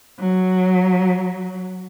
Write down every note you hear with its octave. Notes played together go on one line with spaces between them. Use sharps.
F#3